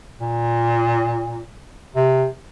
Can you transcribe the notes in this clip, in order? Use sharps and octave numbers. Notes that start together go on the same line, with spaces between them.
A#2
C3